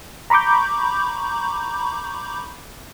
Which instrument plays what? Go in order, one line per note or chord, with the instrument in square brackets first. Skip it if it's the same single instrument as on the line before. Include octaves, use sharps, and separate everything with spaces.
[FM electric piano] A#5 B5 C#6 D6 G6